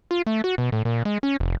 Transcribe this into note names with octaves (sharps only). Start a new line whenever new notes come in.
F4
A3
F#4
B2
A2
A#2
G#3
C#4
F1